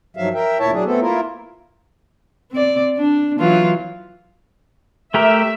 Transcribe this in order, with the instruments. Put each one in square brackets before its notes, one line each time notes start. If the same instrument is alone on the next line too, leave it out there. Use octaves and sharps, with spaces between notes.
[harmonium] G2 D#3 F3 F#3 E5 F5
A#4 E5 G5
D2 A#2 E4 C#5 E5 A5
F#3 D4 G#4
A3 B3 C4 A4
A#3 E4 F4 A#4
[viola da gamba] C4 D5
D4
E3 F#3 F4
[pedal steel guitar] A3 G4 A#4 [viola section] E5